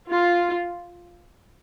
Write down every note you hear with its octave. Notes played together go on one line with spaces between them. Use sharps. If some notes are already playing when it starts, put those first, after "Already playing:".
F4